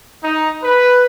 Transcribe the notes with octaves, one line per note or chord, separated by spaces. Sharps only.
D#4
B4